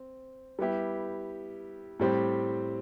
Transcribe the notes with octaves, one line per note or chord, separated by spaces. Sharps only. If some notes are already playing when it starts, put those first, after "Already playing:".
Already playing: C4
G3 B3 E4 G4
A2 G3 C4 G4